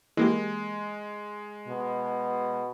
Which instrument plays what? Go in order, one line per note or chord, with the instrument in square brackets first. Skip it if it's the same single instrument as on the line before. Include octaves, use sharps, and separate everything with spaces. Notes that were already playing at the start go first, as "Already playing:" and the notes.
[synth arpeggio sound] E3 A#3 G4 [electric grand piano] G#3
[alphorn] B2